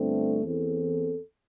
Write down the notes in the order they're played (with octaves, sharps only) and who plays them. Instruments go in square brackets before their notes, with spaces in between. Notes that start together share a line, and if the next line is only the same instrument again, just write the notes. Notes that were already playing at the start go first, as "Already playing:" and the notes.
Already playing: [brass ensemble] G1 G2 D3 A3 C4
E2 E3 C4 A4